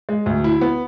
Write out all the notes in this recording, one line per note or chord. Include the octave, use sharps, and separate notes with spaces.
G#3
D2
E4
B3